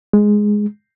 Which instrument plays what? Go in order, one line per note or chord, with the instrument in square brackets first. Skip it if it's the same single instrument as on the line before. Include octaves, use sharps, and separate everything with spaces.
[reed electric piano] G#3